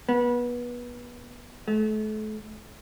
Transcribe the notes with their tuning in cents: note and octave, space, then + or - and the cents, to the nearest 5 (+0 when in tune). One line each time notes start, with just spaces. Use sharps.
B3 -25
A3 -35